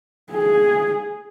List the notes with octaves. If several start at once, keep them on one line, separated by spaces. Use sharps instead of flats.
G#4